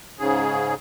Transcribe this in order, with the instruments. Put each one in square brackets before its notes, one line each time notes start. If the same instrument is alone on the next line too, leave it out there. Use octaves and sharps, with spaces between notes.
[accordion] G#2 C#3 G#4